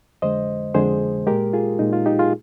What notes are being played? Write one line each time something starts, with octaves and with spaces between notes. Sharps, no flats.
F2 D3 G#3 C5 D#5
F2 D3 G#3 G#4 C5
A#2 G#3 G4 A#4
F4 G#4
A#2 G#3 D#4
F4
D#4 G4
F4 G#4